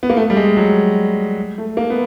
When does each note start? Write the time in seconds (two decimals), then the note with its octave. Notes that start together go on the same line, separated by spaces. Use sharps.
0.03 B3
0.10 A#3
0.16 A3
0.30 G3
0.37 G#3
0.57 F#3
1.58 A3
1.77 A#3
1.90 B3